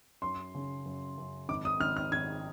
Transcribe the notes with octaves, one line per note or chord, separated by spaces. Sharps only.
F#2 C6
C#3
F#2
F#2
G#1 D6
D#6
G#1 F6
F6
G#1 G#6